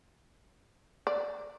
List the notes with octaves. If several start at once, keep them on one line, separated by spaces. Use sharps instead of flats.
D5